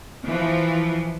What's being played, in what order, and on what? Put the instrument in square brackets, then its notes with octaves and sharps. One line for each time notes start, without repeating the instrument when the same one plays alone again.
[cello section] E3 F3